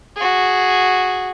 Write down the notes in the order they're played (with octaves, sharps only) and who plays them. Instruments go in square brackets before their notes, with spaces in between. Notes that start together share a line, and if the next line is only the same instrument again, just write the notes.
[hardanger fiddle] F#4 G#4